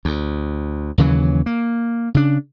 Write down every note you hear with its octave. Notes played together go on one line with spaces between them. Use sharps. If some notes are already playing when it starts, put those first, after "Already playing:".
D2
D#2 C#3 E3 F#3
A#3
C#3 D4